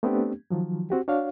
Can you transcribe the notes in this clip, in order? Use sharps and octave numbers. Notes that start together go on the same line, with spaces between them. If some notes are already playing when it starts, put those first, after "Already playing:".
A3 B3 C4 D4 G4
D#3 F3 F#3
C4 F#4 G4
D4 F#4 C#5 F5